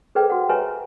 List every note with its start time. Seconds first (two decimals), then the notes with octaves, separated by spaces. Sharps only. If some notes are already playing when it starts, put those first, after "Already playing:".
0.15 G#4 A4 B4 C5 D5 G5
0.30 F#4 F#5
0.49 G4 B4 C#5 E5 G#5 A#5